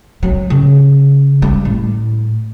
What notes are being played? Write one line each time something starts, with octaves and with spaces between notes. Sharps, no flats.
F#3
C#3
G3
A2